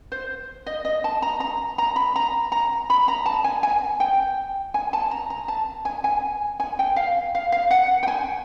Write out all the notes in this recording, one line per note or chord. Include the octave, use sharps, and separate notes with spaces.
C5
D#5
D#5
A5
A#5
A#5
A#5
B5
A#5
A#5
B5
A#5
A5
G#5
G#5
G5
G#5
A5
A#5
A#5
A5
G#5
G#5
G#5
G5
F5
F5
F5
F#5
G5
G#5